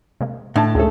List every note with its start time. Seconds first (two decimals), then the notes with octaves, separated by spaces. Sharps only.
0.21 C3 G#3 A#3
0.56 A2 D3 D#5 A5
0.75 D2 A#2 G#3 A3 A4